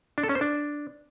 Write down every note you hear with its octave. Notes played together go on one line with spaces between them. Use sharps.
D4
A4
C#4
C5
D4